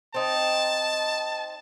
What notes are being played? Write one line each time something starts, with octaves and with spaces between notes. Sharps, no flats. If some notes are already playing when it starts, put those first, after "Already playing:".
C4 D#4 A5